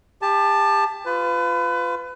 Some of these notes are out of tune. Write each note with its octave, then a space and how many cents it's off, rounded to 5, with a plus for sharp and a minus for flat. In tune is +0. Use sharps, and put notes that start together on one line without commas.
G4 +30 A5 +0
F4 +0 B4 +30